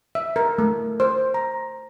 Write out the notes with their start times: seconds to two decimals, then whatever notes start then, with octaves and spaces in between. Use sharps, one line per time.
0.15 E5
0.36 A#4
0.58 A3
1.00 C5
1.34 A#5